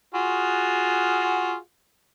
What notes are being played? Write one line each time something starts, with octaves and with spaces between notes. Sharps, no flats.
F4 F#4 G#4